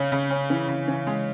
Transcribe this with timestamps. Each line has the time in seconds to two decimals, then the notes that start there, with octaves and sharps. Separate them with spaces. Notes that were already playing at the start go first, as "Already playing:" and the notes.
Already playing: C#3 C#4
0.12 C#3
0.30 C#4
0.50 E3
0.68 C#3
0.88 E3
1.07 G#3